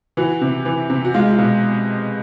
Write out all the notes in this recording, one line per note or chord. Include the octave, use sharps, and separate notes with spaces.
E3 F#4
C3
E3
C3
F#4
G#3 F4
F4
B2